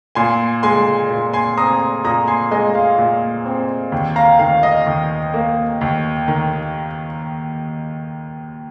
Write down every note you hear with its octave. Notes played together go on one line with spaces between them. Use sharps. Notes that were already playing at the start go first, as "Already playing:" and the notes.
A#2 G#5 C6
G#3 G#5 C6
A#2
G#5 C6
C4 A#5 D#6
A#2 A#5 D#6
G#5 C6
G#3 D#5 G#5
F5
A#2
C4
D#2
F5 A#5
D#3 F5
D#5
D#2
A#3
D#2
D#3